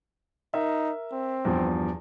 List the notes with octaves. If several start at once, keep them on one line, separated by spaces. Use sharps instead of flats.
D#4 A#4 E5
C4
E2 G2 F3